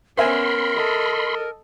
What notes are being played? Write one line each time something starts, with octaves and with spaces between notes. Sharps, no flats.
B3 C#4 A#4 C5 E5 G#5 B5 C6
A4 D#5